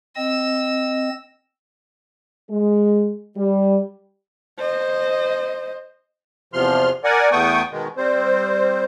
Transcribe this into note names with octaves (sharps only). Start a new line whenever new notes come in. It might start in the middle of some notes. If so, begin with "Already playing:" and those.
C4 D#5 E6
G#3
G3
C5 D#5
E2 C3 F3 C6 F6
A#4 D5 F#5 G#5
E2 A3 B3 G5 C#6 D#6
B2 D#3 G#3
G3 C4 C5